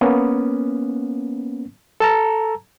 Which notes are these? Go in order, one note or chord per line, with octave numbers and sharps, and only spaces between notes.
A#3 B3 C#4
A4 A5 A#5